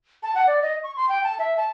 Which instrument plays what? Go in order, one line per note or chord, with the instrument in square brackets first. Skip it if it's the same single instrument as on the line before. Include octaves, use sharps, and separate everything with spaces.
[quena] A5
F#5
D5
D#5
C#6
C6
G5
A5
E5
A5